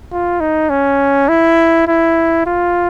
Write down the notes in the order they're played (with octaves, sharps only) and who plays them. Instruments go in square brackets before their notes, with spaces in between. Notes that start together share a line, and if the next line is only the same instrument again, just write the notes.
[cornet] F4
D#4
C#4
E4
E4
F4